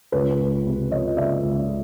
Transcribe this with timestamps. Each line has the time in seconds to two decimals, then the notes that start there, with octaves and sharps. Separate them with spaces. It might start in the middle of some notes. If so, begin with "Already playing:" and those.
0.12 C#2 B4 C#5
0.39 C#2
0.66 C3
0.91 F3 C#5 D#5
1.17 C#2 D5 E5
1.43 C#2